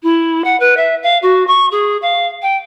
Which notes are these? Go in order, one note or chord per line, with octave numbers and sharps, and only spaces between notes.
E4
F#5
B4
E5
F5
F#4
C#6
G#4
F5
G5